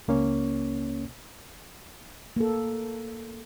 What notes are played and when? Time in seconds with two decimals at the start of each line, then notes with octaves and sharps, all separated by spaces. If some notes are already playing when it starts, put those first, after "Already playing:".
0.08 C#2 A#3 C#4 C#5
2.36 A#3 A4